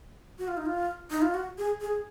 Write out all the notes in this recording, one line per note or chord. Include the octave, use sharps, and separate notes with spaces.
F#4
F4
D#4
F4
D#4
F4
F#4
G#4
G#4